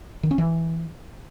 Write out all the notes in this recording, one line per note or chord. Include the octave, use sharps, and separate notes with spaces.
D#3
C#4
E3